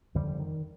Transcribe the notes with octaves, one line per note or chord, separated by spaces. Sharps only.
F2 D3 D#3 G3
D#3